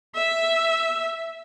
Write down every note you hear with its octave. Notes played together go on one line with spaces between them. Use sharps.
E5